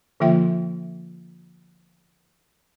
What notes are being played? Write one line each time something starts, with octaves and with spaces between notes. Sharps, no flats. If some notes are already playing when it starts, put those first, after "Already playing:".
D3 F3 A#3 F4 E5 G5